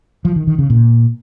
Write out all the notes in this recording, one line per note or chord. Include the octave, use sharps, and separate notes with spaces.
F3
D#3
D#3
C#3
A#2